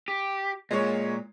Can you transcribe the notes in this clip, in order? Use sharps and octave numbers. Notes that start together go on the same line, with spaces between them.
G4
A#2 G#3 C#5